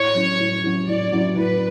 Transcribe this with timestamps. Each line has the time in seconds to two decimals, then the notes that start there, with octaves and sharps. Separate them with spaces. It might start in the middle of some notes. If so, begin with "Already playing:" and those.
Already playing: A2 C#5
0.15 F#3 C#4 E4
0.39 A2
0.63 F#3 C#4 E4
0.88 A2 D5
1.12 F#3 C#4 E4
1.36 A2 B4